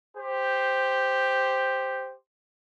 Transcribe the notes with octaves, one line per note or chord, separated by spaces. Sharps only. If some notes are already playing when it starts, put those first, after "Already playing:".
G4 C5